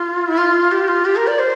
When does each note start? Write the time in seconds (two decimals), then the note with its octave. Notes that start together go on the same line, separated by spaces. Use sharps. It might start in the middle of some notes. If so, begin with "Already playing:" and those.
Already playing: F4
0.28 E4
0.37 F4
0.71 G4
0.88 F4
1.05 G4
1.16 A#4
1.27 D5
1.39 C5